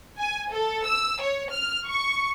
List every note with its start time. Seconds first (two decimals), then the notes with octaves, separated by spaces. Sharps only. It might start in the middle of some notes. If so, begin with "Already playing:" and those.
0.18 G#5
0.52 A4
0.85 E6
1.21 C#5
1.51 F6
1.86 C#6